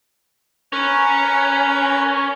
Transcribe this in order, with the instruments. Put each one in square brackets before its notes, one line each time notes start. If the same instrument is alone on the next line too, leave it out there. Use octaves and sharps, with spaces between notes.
[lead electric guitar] C#4 [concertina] A#4 B4 A#5